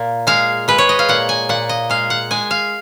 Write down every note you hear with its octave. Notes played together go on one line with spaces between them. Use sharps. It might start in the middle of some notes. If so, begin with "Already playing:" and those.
Already playing: A#2
G#3 F5
G#3 B4
C#5
D#5
F5
A#2 F#5
G#5
A#2 F#5
D#5
G#3 F5
F#5
G#3 G#5
F5